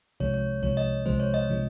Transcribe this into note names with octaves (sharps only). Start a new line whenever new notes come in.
C2 C3 F3 G#3 C#5
C#5
C2 C3 F3 G#3 C#5
D#5
C2 C3 F3 G#3 C5
C#5
D#5
C3 F3 G#3